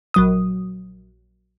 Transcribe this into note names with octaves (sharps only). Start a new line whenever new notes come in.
A#1 F#3 D#6